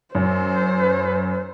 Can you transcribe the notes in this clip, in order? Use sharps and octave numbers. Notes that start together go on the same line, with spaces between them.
F#2 C5